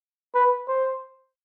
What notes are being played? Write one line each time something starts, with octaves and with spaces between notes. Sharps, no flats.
B4
C5